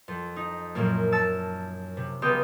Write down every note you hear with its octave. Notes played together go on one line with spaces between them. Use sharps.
F2
D#4
F#2 A#2 F3 A#3
A5 E6 A6 C#7
C3
C#2 B3 G4 A#4 G5 D#6